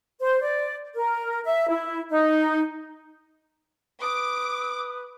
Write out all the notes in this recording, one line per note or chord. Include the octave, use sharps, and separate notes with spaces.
C5
D5
A#4
E5
E4
D#4
B4 D6 D#6